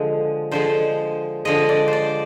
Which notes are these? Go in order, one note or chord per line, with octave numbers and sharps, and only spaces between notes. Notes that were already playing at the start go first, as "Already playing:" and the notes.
Already playing: D3 F3 G#3
D3 F3 G#3 C5
D3 F3 G#3 D#5
D5
C5
D5